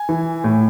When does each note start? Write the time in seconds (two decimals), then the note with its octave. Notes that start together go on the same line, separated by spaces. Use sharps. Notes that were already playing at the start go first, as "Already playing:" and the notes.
Already playing: G#5
0.09 E3
0.44 A2